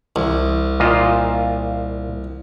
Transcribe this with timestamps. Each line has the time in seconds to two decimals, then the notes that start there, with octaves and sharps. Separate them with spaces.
0.16 C2
0.80 A#2 F4 D#5